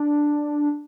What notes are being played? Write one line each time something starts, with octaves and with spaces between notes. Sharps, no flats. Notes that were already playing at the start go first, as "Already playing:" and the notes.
Already playing: D4